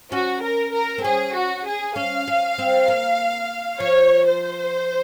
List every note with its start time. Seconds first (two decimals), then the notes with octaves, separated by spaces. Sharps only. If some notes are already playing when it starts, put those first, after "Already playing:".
0.12 C#4 F#4
0.44 A#4
0.74 A#4
0.98 C4
1.04 C#4 G#4
1.34 F#4
1.66 G#4
1.96 C#4 F5
2.28 C#4
2.58 C4
2.88 A#3
3.80 F3 C#5
4.26 C5